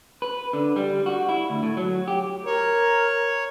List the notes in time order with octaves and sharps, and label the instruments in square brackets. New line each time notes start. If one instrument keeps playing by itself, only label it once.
[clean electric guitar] B4
D3
G3
F#4
E4
D2
A2
F#3
G4
[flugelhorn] A#4 [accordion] C#5